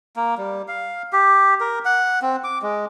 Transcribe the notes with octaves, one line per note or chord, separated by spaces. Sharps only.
A#3
G3
F5
G4
A#4
F#5
C4
D6
G#3